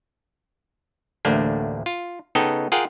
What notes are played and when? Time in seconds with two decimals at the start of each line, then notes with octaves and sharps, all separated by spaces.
1.25 A1 D2 A3 A#3 D4
1.86 F4
2.35 C#3 B3 D#4 A4 D#5 G5
2.72 F4 G#4 A#4 F#5 G5